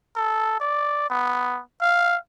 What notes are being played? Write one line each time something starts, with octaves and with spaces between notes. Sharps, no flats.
A4
D5
B3
F5